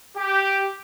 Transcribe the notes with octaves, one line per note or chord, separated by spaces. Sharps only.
G4